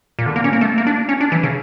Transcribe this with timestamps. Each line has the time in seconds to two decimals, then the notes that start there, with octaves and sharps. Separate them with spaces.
0.19 A#2
0.26 D3
0.36 A#3
0.44 C#4
0.53 A#3
0.61 A3
0.78 A#3
0.87 D4
1.09 C#4
1.21 D4
1.32 E3
1.43 C#3